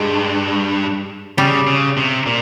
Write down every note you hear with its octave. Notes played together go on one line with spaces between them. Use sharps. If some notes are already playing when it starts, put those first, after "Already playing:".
Already playing: G2 G#3
C#3 G3
C#3
C3
A#2